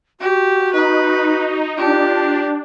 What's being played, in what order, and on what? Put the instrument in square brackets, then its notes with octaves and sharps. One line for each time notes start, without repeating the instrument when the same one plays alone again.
[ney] F#4 [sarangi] G4
[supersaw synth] D#4 [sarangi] B4
[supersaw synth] D4 [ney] F4 [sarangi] G4